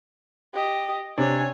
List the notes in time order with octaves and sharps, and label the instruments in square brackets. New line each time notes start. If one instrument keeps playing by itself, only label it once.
[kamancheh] G4 D#5
[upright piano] C3 D4 [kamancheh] C#5 G#5